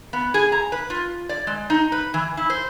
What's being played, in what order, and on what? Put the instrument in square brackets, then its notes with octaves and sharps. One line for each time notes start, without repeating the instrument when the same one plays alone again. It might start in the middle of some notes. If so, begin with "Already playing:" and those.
[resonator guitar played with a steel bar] B3
G#4
A#5
B4
F4
D5
G#3
D#4
B4
E3
E4
C5